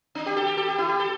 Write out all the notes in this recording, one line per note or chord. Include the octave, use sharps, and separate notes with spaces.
D4
G4
A4
G4
A4
G4
E4
G4
A4